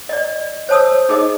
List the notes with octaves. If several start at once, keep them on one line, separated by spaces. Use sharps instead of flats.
D5 D#5
C5 C#5 A5 D#6 E6
D#4 G#4 A#4 D#5